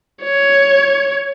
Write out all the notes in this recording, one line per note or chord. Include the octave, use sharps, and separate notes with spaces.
C#5